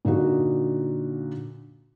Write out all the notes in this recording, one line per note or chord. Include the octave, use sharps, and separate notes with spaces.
A#2 D3 D#4 F#4